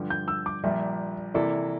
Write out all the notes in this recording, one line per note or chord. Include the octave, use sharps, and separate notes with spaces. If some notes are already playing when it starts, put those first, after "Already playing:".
Already playing: G2 D3 F3
G6
E6
D6
A#1 A#2 G3 E5
C3 E3 A#3 E4 A4 D5